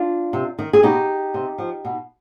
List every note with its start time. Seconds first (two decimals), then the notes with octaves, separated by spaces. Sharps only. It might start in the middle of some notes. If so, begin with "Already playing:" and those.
Already playing: D4 F4
0.33 C3
0.59 D#3
0.73 G#4
0.83 B2 D#4 G4
1.34 C3
1.58 F3
1.85 B2